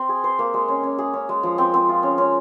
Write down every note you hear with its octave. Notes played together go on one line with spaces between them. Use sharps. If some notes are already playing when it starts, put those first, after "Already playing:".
Already playing: C4
G#4
C5
A#3
G#3
C#4
C#4
G#4
C#4
G#3
F3
C4
C4
F4
C#4
C#4